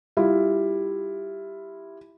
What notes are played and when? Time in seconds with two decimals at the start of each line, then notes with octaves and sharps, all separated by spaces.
0.17 G3 E4 F4